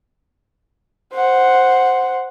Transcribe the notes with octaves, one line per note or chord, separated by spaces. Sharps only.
C5 F#5